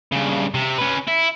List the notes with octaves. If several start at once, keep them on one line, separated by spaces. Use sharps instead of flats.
G2 C#3
C3
C#4 B4
E4